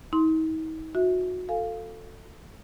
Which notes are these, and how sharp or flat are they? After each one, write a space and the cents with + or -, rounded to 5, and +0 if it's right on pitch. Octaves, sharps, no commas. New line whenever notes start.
D#4 +40 C6 +0
F#4 -25 E5 -15
A4 +15 F5 +0 G#5 +0